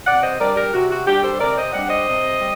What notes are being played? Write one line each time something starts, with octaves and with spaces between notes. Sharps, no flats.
C3 D5 F#5
C5 D#5
G3 D4 A#4 D5
G4 A#4
C3 F#4
F#4
G3 D4 G4
A4 C5
C3 A#4 D5
C5 D#5
G3 D4 D5 F#5
C5 D#5
C3
G3